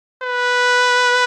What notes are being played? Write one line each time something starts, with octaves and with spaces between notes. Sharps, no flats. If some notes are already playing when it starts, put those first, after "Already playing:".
B4